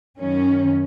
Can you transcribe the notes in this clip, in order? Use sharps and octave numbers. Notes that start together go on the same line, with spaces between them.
F#2 D#3 C#4